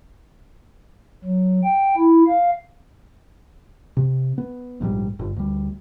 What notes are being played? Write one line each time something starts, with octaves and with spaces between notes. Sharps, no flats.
F#3
G5
E4
F5
C3
B3
A#1 G#2 D3 G3
G1 G2
D2 G3